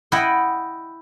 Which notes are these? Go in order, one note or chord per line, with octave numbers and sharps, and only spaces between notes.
E4 D#5 F#5 G5